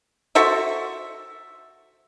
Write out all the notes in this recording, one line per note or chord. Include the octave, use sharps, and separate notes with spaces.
F#4 A4 C5 E5